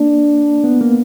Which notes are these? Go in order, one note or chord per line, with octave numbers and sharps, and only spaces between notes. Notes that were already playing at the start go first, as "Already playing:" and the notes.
Already playing: A#3 D4
B3
A#3